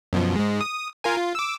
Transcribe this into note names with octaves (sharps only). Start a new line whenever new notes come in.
F#2 B2 F3
G#2 G#3
D#6
F4 A#4 G#5
F4
D6 E6